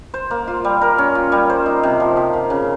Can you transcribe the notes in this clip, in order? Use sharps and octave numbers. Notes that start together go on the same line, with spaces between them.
C5
A#3
F4
G3
A#4
C#4
F4
G3
C5
D#4
C3
F3
G4
A#3
C#3